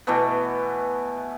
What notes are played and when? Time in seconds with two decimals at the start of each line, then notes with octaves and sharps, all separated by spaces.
0.07 B2 E3 A3 B3